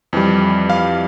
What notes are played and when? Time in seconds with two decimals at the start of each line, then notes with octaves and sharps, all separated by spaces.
0.13 F2 E3 G3
0.70 F5